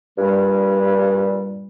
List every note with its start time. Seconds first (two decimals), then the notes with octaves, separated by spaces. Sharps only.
0.18 G2 A#2 G3